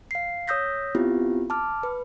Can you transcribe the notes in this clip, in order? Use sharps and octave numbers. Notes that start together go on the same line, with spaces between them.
F5 C7
C#5 D#6 E6 G6 A#6 B6
B3 C4 E4 F4 G4
A5 D6 F6
B4